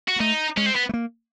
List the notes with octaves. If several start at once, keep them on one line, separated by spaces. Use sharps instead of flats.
F#4
A#3
A3 D#4
G#3 C#4
C4
B3
A3
A#3